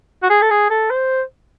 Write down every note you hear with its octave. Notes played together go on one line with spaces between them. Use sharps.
F#4
G#4
A4
G#4
A4
C5